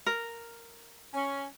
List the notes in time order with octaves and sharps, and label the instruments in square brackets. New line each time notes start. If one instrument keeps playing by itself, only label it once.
[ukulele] A#4
[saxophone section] C#4